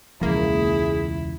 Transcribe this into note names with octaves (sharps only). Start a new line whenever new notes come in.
E1 C#2 F3 A#3 E4 G#4